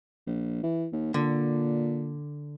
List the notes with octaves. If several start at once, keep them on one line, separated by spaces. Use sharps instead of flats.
A#1
E3
D#2
A#2 D3